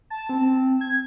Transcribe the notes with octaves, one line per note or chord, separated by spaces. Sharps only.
A5
C4
G#6